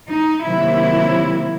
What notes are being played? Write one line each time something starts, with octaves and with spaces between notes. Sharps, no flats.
D#4
C3 D#3 F#3 A#3 E4